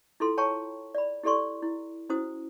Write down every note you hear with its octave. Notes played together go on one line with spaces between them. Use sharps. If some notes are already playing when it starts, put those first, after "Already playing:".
E4 F4 A4 C6
C#5 G5 A5 A#5 C#6
D5 B5
E4 G4 A4 D5 C6 C#6
E4
C#4 E4 F#4 C5 D#6